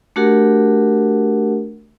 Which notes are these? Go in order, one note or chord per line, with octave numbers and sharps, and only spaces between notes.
A3 D4 F#4 G4 A#4 F#5